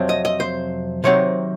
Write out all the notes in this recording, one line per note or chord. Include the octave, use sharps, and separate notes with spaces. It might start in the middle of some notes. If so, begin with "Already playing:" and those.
Already playing: F2 C3 F#3 C4
D#5
D#5
C5
C3 D#3 F#3 C4 C#5